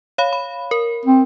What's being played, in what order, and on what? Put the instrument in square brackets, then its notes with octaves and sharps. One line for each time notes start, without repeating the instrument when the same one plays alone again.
[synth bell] C#5 F5 B5
B5
A#4
[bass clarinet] C4